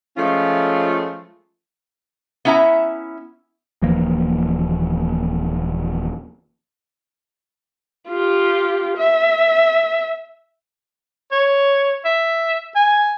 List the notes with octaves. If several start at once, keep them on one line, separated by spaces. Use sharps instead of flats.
F3 G#3 A3 C#4 F4
B3 C#4 E4 E5 A#5
D#1 E3 F3 A#3
F4 G4
E5
C#5
E5
G#5